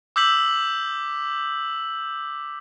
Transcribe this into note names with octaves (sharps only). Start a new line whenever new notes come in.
D6 E6 G6 B6 F#7